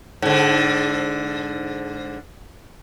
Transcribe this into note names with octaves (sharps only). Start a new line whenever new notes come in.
G#2 D3